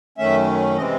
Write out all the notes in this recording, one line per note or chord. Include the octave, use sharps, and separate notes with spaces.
F#2 D#3 A3 C#4 E5
C3 E3 G#3 C4 D#5